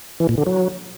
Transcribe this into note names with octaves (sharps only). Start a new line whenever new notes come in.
E3
A#2
D3
F#3